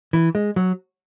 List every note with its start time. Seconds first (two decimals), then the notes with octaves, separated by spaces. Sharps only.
0.13 E3
0.35 G#3
0.56 F#3